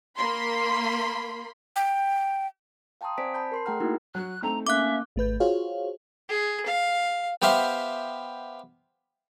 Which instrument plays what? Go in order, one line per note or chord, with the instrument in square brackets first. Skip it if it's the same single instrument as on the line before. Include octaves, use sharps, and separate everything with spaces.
[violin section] A#3 B5 C6
[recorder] G5
[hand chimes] F5 G5 A5 A#5 C6 D#6
C4 C5 D5 G#5 B6 D7
A5 B5 G6
A#4 C6 C7
A3 G#4 F#5 G5 A#5 F6
A3 A#3 D#4 E4 F#4 A#4
[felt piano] F#3 F#4 [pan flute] F#6
[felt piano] A3 C4 D#4 [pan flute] A#5
[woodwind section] A#3 C#4 [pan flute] E5 [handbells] D6 F#6
[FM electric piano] G#1 A3 B4 G6
F4 F#4 G#4 C5 C#5 F5
[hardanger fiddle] G#4
F5
[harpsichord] B3 G4 C5 E5 F5